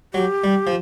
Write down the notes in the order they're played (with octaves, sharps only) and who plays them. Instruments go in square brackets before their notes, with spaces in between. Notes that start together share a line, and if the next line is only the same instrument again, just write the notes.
[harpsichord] F#3 [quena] G4
[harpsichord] G3
F3